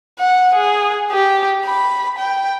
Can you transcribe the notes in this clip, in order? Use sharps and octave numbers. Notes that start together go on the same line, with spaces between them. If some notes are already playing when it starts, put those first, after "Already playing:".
F#5
G#4
G4
B5
G5